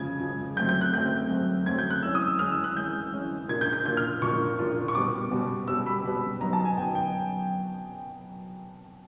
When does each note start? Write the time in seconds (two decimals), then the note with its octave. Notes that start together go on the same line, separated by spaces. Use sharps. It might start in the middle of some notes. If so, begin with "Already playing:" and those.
Already playing: C#3 F3 G#3 G#6
0.20 C#3 F3 G#3
0.56 F#3 A3 C4 G6
0.69 G6
0.81 F#6
0.93 F#3 A3 C4 G6
1.30 F#3 A3 C4
1.66 F#3 A3 C4 G#6
1.79 G6
1.90 F#6
2.03 E3 G#3 C#4 E6
2.15 D#6
2.27 E6
2.39 E3 G#3 C#4 F6
2.51 E6
2.64 F#6
2.76 E3 G#3 C#4 G6
3.12 E3 G#3 C#4
3.48 A#2 F3 A#3 D4 F4 G#6
3.61 G6
3.73 G6
3.85 A#2 F3 A#3 D4 F4 G6
3.97 F6
4.22 A#2 F3 A#3 D4 F4 C#6
4.59 A#2 F3 A#3 D4 F4
4.88 C#6
4.95 B2 G3 B3 D6
5.31 B2 G3 B3
5.68 B2 G3 B3 E6
5.86 B5
6.04 B2 G3 B3
6.41 F#3 B3 D#4 A#5
6.53 A5
6.65 G#5
6.77 F#3 B3 D#4 G5
6.95 G5